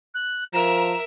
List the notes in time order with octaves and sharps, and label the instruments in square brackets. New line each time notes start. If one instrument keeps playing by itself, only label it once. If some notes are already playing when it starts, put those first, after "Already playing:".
[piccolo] F#6
[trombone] F3 [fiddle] A#4 E5 [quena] A#5 [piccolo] E7